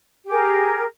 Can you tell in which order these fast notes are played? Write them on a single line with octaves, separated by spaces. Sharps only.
G4 G#4 A#4